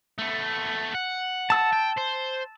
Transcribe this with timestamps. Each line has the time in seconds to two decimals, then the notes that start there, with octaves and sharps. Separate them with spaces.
0.19 A3 B3
0.94 F#5
1.50 A5 E6
1.73 G5
1.98 C5